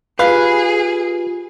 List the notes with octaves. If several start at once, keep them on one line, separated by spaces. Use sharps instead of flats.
F4 G4 G#4 B4 F5